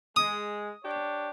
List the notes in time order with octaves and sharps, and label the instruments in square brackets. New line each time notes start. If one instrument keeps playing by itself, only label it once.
[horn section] G#3 [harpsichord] D#6
[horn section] D4 G4 C#5